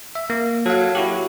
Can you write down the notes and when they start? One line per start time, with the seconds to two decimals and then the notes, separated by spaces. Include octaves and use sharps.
0.15 E5
0.30 A#3
0.66 F#3 A4 F5
0.95 E4 F#4 G4